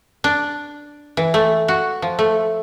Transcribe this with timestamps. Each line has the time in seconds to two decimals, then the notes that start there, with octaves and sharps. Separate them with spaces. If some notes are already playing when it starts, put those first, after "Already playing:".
0.24 D4
1.17 E3
1.34 A3
1.68 F#4
2.02 F3
2.19 A3